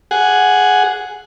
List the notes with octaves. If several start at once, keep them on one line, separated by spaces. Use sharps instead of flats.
G#4 F#5